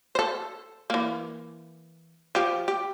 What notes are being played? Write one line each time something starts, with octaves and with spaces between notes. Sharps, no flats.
A4 C5
E3 A#3
F3 G4
G4